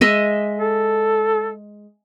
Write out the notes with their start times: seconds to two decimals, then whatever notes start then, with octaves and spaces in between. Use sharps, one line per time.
0.01 G#3 D#5 E5
0.60 A4